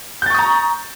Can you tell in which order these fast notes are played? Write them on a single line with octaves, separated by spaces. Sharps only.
G6 A6 C#6 D#6 A#5